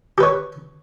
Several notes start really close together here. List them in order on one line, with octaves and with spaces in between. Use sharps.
G4 B4 C#5